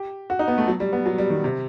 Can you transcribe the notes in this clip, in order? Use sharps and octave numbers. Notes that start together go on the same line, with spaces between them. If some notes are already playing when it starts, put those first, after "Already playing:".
Already playing: G4
F#4
D#4
B3
A3
F#3
G3
B3
F#3
G3
D#3
C3